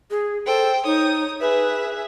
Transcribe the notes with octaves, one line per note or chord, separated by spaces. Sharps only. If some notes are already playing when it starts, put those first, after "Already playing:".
G#4
A4 C5 G5
D#4 C#5 D#6
G#4 B4 E5